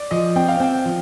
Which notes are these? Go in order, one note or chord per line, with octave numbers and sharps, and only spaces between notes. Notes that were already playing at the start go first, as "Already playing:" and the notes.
Already playing: D5
F3 D#5
C4 G5
F5
C4 G5
F3